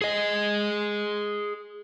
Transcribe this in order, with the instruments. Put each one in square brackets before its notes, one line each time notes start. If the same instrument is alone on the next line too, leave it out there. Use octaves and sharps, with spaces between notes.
[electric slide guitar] G#4 D#5